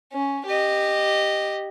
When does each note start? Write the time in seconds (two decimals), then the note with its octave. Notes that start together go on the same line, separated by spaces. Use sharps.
0.12 C#4
0.46 G4 D#5